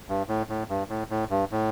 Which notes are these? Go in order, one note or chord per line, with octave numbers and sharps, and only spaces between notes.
G2
A2
A2
G2
A2
A2
G2
A2